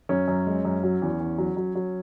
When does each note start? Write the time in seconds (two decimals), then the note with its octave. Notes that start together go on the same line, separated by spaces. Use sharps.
0.09 F#2 C#4
0.28 F#2
0.46 G#3
0.65 F#2
0.83 F#3
1.02 E2
1.20 E2
1.38 F#3
1.57 F#3
1.75 F#3